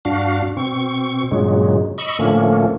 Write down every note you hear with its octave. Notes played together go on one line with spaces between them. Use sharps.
G2 D4 F#4 F5
B2 C4 C#6
G2 A#2 C#3 F#3 G#3
D#5 B5 C#6 E6
A2 D3 F3 A3 A#3 C#4